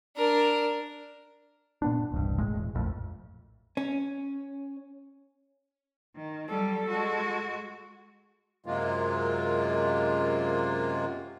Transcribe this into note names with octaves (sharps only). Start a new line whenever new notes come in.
D4 A#4
A#2 B3 D4
E1 C2 G2
G#1 A2 G#3
E1
A#1 F2 A2
C#4
D#3
F#3 G3 A4
G#3 F#4
F#2 C3 F#3 G#3 A#3 F4